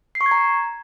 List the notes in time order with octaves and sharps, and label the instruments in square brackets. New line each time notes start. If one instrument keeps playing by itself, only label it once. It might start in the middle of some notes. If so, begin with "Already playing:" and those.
[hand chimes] C7
C#6
G#6
A#5